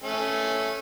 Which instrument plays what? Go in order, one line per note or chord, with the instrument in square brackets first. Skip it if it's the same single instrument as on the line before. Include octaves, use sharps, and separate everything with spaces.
[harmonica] A3 C#4